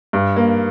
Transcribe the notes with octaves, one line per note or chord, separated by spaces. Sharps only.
G2
A#3